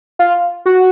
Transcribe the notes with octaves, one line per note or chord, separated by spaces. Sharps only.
F4
F#4